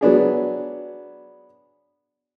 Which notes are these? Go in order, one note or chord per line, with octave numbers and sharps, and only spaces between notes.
F#3 B3 D4 G#4